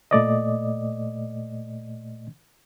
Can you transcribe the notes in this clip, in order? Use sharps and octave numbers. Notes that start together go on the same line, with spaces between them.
A#2 A3 D5 D#5